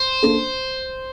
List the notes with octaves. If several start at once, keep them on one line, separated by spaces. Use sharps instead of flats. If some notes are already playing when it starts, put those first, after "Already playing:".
Already playing: C5
A#3 D4 A4